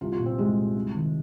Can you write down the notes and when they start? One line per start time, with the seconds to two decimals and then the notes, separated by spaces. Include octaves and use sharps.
0.01 C2 F4
0.12 F4
0.19 A#2
0.25 C4
0.39 C2 G#3
0.56 A#2
0.75 C2
0.94 C3 D#3